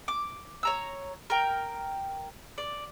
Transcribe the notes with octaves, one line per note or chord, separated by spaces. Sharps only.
D6
C#5 A#5 E6
A#4 G5
D5